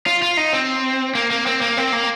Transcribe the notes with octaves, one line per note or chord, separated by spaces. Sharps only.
F4
F4
D#4
C4
A#3
A#3
C4
A#3
C4
A#3